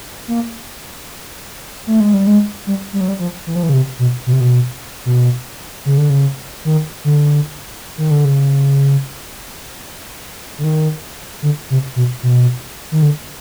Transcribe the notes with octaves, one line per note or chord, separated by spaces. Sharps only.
A#3
A3
G#3
G3
G#3
G3
G3
F#3
G3
F3
E3
F3
E3
C#3
C3
B2
B2
C3
B2
B2
C#3
D3
C#3
D#3
D3
D#3
D3
C#3
D3
D#3
D3
C3
B2
B2
D#3
D3